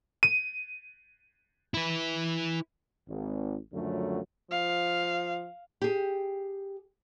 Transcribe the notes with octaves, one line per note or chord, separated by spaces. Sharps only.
D#7
E4 B4
G#1
C#2 F#2 D3 F3 F#3 A3
F3 F5
G4 G#4